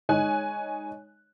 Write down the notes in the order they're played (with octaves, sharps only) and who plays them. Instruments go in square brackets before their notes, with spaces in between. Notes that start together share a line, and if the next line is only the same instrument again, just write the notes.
[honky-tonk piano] G#3 D#4 C#5 G#5 F#6